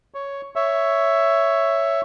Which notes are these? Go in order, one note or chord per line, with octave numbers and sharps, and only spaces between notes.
C#5
C#5 E5